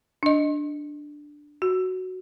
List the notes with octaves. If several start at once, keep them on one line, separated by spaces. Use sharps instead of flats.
D4 D#5
F#4